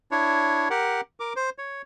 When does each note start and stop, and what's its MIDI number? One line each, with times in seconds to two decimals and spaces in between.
0.11 0.69 62
0.11 0.69 64
0.11 0.69 73
0.70 1.01 67
0.70 1.01 70
0.70 1.01 78
1.20 1.33 70
1.20 1.33 86
1.36 1.50 72
1.58 1.82 73